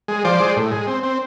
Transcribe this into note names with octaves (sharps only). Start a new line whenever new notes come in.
G#3
F3 C5 D5
G#3
A2
G#3
C4
C4